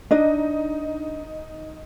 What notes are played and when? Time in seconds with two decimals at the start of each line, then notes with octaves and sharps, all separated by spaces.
0.11 D4 D#4 D#5